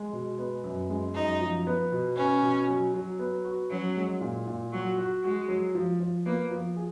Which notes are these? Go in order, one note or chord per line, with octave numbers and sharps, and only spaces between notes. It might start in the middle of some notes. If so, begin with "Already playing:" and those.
Already playing: G#3
B2
B3
F#2
G#3
F#2 D#4
F3
B3
B2
B3 C#4
B2
F#3
F#3
B3
F#4
F#3 C#4
G#3
A#2
A#2
F#3 F#4
F#4
G#3 F#4
F#3
F3
F3
A#3 B3
F3
G#4